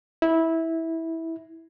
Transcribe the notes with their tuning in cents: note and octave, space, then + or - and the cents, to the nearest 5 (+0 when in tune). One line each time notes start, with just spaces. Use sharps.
E4 -15